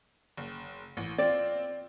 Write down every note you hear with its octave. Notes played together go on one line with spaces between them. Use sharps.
F#1
A1
C4 F4 D5